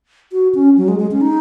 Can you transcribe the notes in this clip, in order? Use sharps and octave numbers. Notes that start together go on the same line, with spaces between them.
F#4
C#4
F#3
G#3
G#3
C#4
D#4